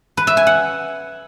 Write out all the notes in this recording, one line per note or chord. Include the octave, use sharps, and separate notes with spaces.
B4
E5
G#5
F#5